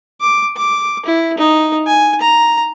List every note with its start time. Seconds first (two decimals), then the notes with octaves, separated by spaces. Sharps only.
0.21 D6
0.57 D6
1.06 E4
1.37 D#4
1.87 G#5
2.21 A#5